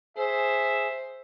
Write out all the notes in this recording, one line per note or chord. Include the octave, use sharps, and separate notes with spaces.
G#4 C5 E5